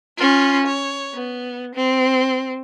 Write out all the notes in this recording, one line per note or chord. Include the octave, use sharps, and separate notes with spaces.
C#4 F4
C#5
B3
C4